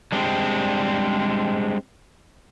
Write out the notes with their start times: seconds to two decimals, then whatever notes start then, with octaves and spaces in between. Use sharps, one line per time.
0.12 G3 G#3 C4 D4